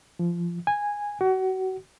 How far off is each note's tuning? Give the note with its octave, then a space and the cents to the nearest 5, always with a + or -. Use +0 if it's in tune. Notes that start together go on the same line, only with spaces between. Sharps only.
F3 -20
G#5 -10
F#4 +30